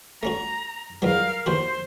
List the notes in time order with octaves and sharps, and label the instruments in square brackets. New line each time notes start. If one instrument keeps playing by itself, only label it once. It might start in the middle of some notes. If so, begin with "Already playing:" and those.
[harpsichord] A3 C#4 F#4 [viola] A#5
[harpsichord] E2 B2 F#3 [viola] A#4 F5
[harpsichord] D#2 E3 F#4 [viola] C5